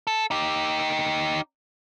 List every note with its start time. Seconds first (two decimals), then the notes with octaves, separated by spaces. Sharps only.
0.07 A4
0.31 D#4 G4